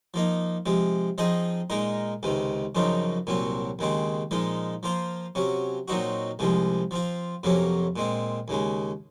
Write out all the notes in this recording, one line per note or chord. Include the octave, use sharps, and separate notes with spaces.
F3 A#3 D#4
C3 F3 G#3
F3 C4 D#4 G#4 D#5
A#2 G#3 D#4 A#4
C#2 C3 D#3
F#2 C#3 F3 C4 D#4
C2 A#2 F#3 C4
D#2 C#3 G#3 C4
A#2 F3 G#3 D#4
F3 A#3 F4 C5
C3 F#3 C#4
A#2 F#3 C4 D#4 F#4
C2 C3 F3 G#3
F3 C4 F4
F2 C3 F#3 A#3 C#4
A#2 G#3 C4
D#2 C#3 G#3